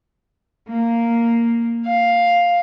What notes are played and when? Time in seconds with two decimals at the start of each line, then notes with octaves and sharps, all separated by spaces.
0.68 A#3
1.87 F5